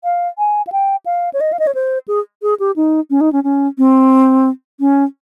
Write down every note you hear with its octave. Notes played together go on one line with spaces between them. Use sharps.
F5
G#5
F5
G5
F5
C#5
D#5
F5
D#5
C#5
C5
G#4
G#4
G4
D#4
C#4
D#4
C#4
C#4
C4
C#4